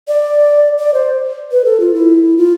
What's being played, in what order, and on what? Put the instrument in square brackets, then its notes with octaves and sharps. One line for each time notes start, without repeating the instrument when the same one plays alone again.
[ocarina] D5
D5
C5
B4
A4
F4
E4
F4